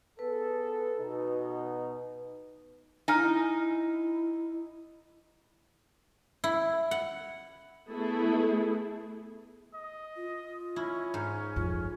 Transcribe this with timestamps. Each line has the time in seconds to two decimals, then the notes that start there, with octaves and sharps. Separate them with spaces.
0.19 B3 G#4 A4 B4
0.99 B2 D#4
3.08 D#4 E4 G#5 A#5 F6
6.44 E4
6.91 F#5
7.89 A3 B3 E4 G#4
9.74 D#5
10.16 F4
10.76 C#4 E4
11.14 G#2
11.56 F2 F4